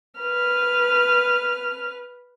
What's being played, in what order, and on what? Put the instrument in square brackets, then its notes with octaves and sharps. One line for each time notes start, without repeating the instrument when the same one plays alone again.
[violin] B4 F6